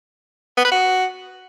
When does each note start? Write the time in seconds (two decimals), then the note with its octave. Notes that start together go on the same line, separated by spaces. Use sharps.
0.58 B3
0.65 B4
0.72 F#4